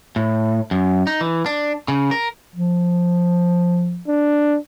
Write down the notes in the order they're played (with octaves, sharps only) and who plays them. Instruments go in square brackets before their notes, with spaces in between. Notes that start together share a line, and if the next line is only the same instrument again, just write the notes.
[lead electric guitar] A2
F#2
D#4
E3
D4
C#3
A#4
[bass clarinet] F3
[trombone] D4